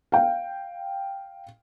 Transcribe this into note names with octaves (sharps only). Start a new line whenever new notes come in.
F5 G5